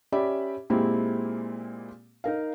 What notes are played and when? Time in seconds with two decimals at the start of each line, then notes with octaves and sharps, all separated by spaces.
0.12 C#4 G4 D5 E5 B5
0.70 A#2 G#3 A#3 C4 E4 G4
2.24 D#4 A#4 F5